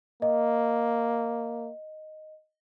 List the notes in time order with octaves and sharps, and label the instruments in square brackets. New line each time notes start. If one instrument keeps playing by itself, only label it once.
[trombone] A#3 [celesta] D#5